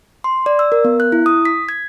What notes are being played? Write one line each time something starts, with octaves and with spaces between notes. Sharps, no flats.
C6
D5
E6
A#4
B3
F#6
E4
D#6
B6
G#6